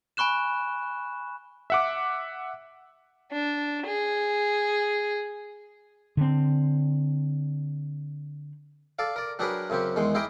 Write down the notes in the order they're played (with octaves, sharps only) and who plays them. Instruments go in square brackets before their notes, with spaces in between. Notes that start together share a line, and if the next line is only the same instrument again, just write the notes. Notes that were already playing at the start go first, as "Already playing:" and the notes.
[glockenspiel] G#5 B5 C#6 F#6 E7
[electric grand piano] E5 F#5 D6
[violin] D4
G#4
[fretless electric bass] D3 C4
[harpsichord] A4 D5 F5
A#4 D5
F#3 D4 G4 G#4 A#4 B4
F#2 C#3 C4 G4
E2 D#3 G#3 C6
E4 G4 G#4 A#4 D#5 G5